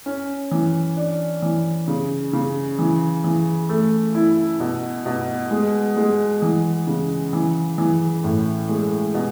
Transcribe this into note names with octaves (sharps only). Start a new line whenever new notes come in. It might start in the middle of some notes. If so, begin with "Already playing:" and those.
C#4
E3
D4
E3
C#3
C#3
E3
E3
A3
E4
B2
B2
G#3
G#3
E3
C#3
E3
E3
A2
G#3
B2